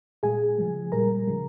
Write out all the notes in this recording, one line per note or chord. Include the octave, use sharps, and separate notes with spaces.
A#2 G#3 G#4 G#5
C#3 F3 G#3
A#2 G3 A#4 A#5
C#3 F3 G#3